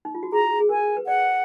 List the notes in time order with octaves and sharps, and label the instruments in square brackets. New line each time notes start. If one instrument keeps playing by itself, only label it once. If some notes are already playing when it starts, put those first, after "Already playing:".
[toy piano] D#4
F4
F#4
[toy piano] G#4 [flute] A#5
[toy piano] G#4
[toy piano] A#4 [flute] G#5
[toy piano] B4
[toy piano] D5 [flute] F#5